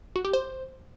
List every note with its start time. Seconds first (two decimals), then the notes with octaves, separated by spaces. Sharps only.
0.16 F#4
0.25 G4
0.33 C5